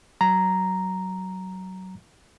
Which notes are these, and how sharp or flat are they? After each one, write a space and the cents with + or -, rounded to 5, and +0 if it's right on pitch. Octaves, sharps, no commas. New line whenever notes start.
F#3 +20 A#5 +0